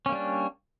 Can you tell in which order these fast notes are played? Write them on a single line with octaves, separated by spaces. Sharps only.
C#4 A#3 G3 D4